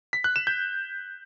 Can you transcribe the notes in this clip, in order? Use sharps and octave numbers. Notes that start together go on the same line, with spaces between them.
B6
F#6
E7
G6